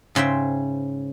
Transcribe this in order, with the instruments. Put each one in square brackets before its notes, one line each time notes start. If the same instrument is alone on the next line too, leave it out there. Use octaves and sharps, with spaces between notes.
[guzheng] G#2 C#3 C5 E5 G5